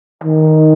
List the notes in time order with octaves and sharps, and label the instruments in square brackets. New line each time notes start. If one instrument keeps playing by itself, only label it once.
[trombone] D#3